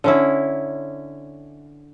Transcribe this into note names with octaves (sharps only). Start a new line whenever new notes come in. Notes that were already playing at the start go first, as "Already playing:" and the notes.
D3 C#4 E4